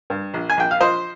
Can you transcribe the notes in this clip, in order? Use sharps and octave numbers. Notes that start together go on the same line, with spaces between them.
G2
A#1
G#5
A#1 G5
F5
F3 C5 D#5